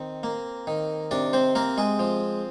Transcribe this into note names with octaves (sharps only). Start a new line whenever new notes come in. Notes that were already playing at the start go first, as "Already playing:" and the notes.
Already playing: D#3 C4
A#3
D#3
C3 D4 D5
C4 C5
A#3 C4 A#4
G#3 G#4
F3